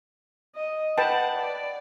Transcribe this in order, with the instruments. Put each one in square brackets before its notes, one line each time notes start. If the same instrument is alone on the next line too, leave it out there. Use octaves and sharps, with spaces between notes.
[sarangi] D#5
[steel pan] B4 G5 A5 [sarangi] F#5
[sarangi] D5